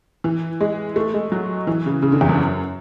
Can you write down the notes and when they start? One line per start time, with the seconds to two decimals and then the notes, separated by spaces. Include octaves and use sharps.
0.24 E3
0.61 G#3
0.96 A3
1.14 G#3
1.32 F#3
1.67 E3
1.86 C#3
2.02 C#3
2.12 D3
2.21 E2
2.29 F#2